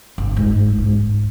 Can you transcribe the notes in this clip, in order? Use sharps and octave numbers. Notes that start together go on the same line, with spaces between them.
G1
G#2
G#2